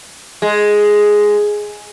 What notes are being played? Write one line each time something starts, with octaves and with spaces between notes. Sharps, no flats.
G#3